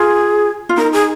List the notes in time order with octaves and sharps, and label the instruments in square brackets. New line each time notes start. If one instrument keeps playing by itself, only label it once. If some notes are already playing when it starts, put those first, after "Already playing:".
Already playing: [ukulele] F4 [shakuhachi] G#4
[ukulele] F4
[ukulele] D#4 [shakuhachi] A#4
[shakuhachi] G#4